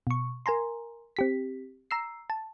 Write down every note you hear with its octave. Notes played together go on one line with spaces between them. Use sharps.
B2 C#6
A#4 G#5 A#5 C6
C4 G4 B6
A#5 E6 C7
A5